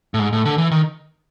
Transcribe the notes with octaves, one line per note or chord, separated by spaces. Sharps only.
A2
G#2
A2
D3
E3
D#3